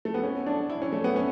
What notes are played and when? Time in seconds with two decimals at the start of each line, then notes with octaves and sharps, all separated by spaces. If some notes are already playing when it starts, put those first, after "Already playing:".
0.05 A3
0.14 B3
0.23 C#4
0.46 D4
0.70 E4
0.82 C#4
0.92 A3
1.04 B3
1.16 C#4